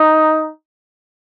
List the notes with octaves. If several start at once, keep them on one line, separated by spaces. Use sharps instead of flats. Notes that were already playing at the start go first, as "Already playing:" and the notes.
Already playing: D#4